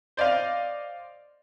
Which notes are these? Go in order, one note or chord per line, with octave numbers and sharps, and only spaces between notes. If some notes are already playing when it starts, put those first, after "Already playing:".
C5 D5 D#5 F5